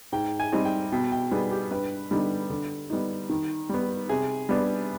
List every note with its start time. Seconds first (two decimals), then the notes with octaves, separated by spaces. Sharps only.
0.12 G#2 G5
0.40 G#5
0.52 G3 C4 D#4
0.65 G5
0.92 B2 G5
1.12 G5
1.31 G3 B3 D#4 G#4
1.51 G4
1.71 G2 B4
2.11 D3 G3 B3 D#4
2.50 D3
2.90 G3 B3 D#4
3.29 D#3
3.69 G3 B3
4.09 C3 G#4
4.49 G3 B3 D4